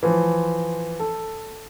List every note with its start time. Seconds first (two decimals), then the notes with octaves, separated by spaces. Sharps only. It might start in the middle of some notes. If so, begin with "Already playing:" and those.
0.03 E3 F3 C5
0.99 A4